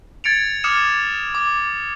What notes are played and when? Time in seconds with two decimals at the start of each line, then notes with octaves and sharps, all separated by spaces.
0.24 G#6 A6 C#7 D7 F7
0.64 D6 D#6 F6 C#7 E7
1.35 D6